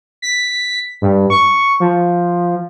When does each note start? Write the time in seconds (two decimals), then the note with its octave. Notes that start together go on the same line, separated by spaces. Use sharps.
0.22 B6
1.02 G2
1.30 C#6
1.80 F3